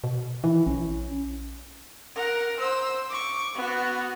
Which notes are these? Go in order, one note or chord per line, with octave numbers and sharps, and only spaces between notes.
B2
E3 E4
A#1 C#4
A#4 F#5
C5 E6
C#6 D6
B3 F#4